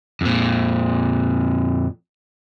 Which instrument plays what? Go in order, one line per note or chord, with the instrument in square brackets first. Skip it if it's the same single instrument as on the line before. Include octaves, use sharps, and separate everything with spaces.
[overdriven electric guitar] F2 A#2